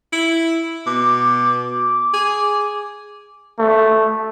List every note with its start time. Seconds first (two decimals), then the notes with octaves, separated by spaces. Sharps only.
0.13 E4
0.86 B2 D6
2.14 G#4
3.59 A3